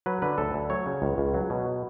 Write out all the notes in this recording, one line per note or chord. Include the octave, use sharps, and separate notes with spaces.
F#3 B4
D3 B4
D2 A4
D2
F#3 C#5
C#3
C#2
C#2
F#3
B2